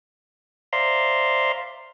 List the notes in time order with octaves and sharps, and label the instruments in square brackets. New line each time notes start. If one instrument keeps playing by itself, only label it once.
[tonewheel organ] C5 D5 E5 F5 A#5 C6